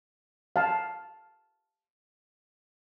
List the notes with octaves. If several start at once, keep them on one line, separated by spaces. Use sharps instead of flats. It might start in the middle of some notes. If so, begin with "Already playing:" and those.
F5 A5